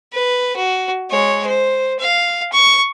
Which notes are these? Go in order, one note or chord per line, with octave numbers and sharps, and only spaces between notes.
B4
F#4
G#3 C#5
C5
F5
C#6